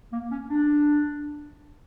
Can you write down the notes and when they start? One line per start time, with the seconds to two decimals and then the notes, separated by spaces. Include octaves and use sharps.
0.13 A#3
0.32 C#4
0.49 D4